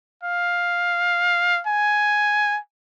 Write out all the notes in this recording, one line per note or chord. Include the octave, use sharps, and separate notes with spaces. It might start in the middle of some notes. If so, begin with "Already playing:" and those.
F5
G#5